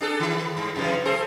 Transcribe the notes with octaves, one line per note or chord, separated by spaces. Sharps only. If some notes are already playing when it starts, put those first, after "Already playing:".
D4 G#4 A4
D#3
G2
F2 C#3 E3
G#4 A4 C5